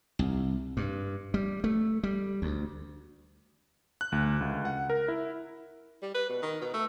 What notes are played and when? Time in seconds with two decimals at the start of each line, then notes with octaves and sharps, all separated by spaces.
0.19 C2
0.77 G2
1.34 G3
1.64 A3
2.03 G3
2.42 D2
4.01 F#6
4.12 D2
4.41 C#2
4.65 F#5
4.90 A#4
5.08 E4
6.02 G3
6.14 B4
6.29 B2
6.42 D#3
6.62 B2
6.74 A3